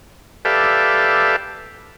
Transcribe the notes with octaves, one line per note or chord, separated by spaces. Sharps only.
G4 A4 B4 D5 E5 F5